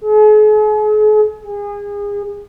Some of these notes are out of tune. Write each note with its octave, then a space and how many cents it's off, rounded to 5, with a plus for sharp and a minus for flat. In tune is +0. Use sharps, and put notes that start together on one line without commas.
G#4 +45
G#4 -30